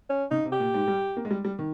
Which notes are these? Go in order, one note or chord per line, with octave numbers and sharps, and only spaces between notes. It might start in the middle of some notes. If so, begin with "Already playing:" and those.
C#4
C#3 D#4
C3
G4
A#2
G#2
G3
A#3
G#3
G3
G3
D#3